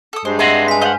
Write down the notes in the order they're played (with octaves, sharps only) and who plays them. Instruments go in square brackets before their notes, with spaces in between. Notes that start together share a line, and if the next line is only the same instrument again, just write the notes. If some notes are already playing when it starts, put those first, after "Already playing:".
[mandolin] A4 D#6
[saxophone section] G2 G#3 [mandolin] C5
[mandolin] C4 E5 C6 [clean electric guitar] G#4 D#5 F#5
[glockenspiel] G#5 B6
[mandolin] C5 F5 [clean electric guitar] D#5 F#5